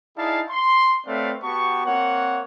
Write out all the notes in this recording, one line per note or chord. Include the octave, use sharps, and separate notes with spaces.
D#4 E4 G#4 D5 F5 A5
C6
A3 C4 B4 C#5 D5 F5
B3 F#4 G4 A5 C#6
A#3 C4 C#5 F#5